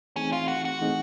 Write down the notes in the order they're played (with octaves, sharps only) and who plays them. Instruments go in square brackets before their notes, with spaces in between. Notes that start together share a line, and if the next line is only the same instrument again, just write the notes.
[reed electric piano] E3 A3 C4 D#4 G#4 [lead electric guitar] C#4
[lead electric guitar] F4
F#4
F#4
[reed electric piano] E3 A3 C4 D#4 G#4